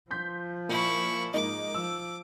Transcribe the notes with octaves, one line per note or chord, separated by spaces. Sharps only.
F3 C6 G6 B6
A#2 E4 C#6
G#2 A#3 D#4 D6
F3 E6